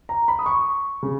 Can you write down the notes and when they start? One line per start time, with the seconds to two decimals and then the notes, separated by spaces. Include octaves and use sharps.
0.09 A#5
0.28 B5
0.39 D#6
0.46 C#6
1.03 C#3